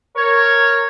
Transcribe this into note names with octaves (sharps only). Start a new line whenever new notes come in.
A#4 C#5